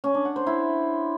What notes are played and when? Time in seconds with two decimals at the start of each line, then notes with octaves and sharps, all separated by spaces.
0.04 C#4
0.14 D4
0.25 F#5
0.36 C5
0.47 E4